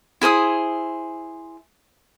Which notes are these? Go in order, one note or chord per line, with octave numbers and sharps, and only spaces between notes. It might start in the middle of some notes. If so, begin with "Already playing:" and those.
E4 G#4 C5 D#6